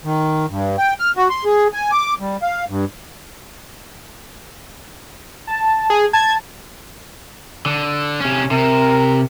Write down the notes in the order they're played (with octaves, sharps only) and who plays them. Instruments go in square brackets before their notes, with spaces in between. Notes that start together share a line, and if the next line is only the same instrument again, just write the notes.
[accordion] D#3
G2
G5
F6
F#4
C6
G#4
G#5
D6
G3
F5
G2
[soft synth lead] A5
[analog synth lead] G#4
[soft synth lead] A5 [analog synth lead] G#6
[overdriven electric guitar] D3
C3 C#4
[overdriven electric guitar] C3 [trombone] A#4